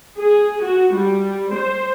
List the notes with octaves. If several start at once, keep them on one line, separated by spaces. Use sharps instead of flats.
G#4
F#4
G3
C5